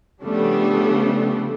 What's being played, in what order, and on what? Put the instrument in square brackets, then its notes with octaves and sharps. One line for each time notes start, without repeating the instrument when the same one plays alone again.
[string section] C#3 F3 G3 A3 B3 D4